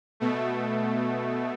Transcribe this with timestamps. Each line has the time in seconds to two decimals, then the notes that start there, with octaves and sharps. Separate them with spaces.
0.20 B2 A3